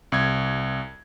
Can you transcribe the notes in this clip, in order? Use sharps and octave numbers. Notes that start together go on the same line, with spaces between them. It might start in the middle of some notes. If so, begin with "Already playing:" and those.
C2 G#6